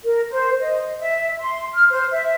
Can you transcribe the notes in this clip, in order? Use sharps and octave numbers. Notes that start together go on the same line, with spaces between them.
A#4
C5
D#5
E5
C6
F6
C5
E5